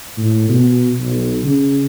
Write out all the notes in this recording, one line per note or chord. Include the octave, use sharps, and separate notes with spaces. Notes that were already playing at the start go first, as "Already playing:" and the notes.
A2
B2
B1
C#3